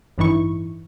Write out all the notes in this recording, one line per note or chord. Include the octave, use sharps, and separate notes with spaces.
A1 G2 E3 D#4 E4 C#6